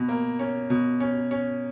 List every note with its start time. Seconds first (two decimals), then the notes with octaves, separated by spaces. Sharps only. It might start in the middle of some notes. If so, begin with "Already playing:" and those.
Already playing: B2
0.08 A#3
0.39 C#4
0.70 B2
1.00 C#4
1.31 C#4